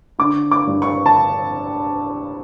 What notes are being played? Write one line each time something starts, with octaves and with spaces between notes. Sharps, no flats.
D3 D6
D6
G2
C#6
A5